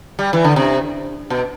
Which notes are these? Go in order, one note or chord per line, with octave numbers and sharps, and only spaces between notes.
G3
E3
D3
C3
B2